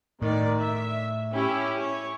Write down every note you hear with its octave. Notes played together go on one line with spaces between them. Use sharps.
A2 D#3 D5
E5
C#4 E4 G4
C#5